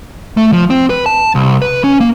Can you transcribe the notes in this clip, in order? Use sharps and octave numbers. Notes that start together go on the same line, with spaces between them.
A3
F3
C4
B4
A5
C2
B4
C#4
A#3